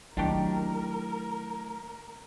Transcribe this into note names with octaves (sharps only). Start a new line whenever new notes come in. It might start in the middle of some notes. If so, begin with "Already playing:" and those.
D#3 F#3 A3 D4 E4 G4 A#4